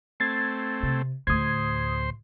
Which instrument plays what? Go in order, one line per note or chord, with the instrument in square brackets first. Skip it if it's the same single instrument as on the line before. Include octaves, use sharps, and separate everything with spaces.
[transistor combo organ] A3 C4 [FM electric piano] G#6 A6 C7
[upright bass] C3
[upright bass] D2 A2 [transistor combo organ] C5 C6 [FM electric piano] D#6 G#6